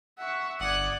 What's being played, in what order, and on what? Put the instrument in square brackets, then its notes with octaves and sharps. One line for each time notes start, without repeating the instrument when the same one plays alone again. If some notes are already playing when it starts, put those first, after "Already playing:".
[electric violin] E5 C#6 [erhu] F#5
[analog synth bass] G1 [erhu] D5 [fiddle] F#5 [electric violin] D#6 G#6